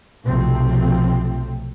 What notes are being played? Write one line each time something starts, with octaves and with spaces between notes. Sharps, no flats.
B1 C3 F3 A3 C4